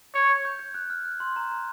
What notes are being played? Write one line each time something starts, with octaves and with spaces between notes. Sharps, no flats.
C#5 G#6
G6
G6
F#6
F6
F#6
C6
A#5
A#5